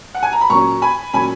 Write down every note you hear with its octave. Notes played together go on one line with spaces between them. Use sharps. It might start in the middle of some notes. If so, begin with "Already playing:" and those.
F#5
G#5
A#5
B5
A#2 F#3 C#4 A#5 C#6
G#5 B5
A#2 F#3 C#4 G#5 B5